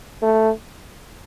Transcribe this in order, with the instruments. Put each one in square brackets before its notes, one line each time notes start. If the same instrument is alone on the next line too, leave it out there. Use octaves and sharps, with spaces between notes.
[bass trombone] A3